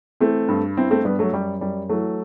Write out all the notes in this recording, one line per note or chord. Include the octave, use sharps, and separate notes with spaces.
E3 A3 C4
G2
G2 C4 E4
A3 C4
G2 G3 B3
F#3 A3
F#2 G3
F#2 G3
E3 F#3 A3